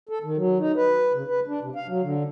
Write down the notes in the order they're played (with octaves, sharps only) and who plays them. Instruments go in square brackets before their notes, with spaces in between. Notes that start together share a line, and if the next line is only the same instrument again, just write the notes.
[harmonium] A4
D#3
F#3
D#4
B4
C#3
B4
D4
C3
F5
F#3
D3